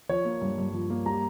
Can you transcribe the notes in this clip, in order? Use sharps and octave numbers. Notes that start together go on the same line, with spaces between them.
F3 C#5
A#3
G2
G2
F3
A#3
G3 A#5